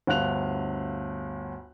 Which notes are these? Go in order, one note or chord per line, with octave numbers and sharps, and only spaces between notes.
G1 D2 F5 F#6 F7